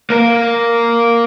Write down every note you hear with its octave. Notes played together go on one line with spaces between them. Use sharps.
A#3 A#4